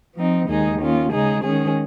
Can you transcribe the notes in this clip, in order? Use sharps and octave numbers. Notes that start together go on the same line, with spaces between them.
F3 C4 D#4
D#2 D#3 G#3 D#4 G#4
D#3 A#3 C#4 F4
C#3 G#3 D#4 G#4
D#3 G#3 C#4 G#4